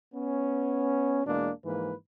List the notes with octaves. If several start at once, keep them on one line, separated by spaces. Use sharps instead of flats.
B3 C#4
E2 B2 G#3 A#3 D4
G#2 E3 F3 A#3 B4